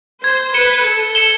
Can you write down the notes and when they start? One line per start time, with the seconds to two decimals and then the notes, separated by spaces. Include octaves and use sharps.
0.24 C5 G#6
0.54 B4 C#7 E7 G7
0.84 A4 G#6
1.15 C#7 E7 G7